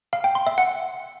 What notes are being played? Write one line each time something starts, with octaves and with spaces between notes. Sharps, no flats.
F5
G5
C6
E5
F#5